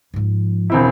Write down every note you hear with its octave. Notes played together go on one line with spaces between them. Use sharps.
G#2 F3
E1 C4 E4